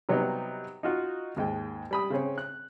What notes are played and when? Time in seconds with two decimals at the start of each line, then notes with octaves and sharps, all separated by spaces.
0.09 C3 F#3 G3 B3 D#4
0.83 D#4 F4 F#4
1.36 D#2 G#2 G5
1.91 G3 B5 D#6
2.10 C#3 C4 C#4
2.38 F#6